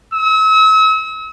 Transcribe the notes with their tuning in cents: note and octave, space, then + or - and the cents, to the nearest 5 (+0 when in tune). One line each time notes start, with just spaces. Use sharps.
E6 -40